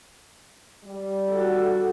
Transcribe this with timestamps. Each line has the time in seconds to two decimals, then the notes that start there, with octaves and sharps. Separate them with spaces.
0.85 G3
1.30 F#4 A4